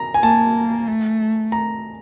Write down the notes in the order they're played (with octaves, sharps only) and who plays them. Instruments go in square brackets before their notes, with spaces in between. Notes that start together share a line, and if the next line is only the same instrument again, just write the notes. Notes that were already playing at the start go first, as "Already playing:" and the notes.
Already playing: [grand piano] A#5
G#5
[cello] A#3 [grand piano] A5
[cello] A3
[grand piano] A#5